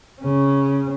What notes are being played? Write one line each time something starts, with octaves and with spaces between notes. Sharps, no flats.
C#3 C#4